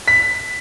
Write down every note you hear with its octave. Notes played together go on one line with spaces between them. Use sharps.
B6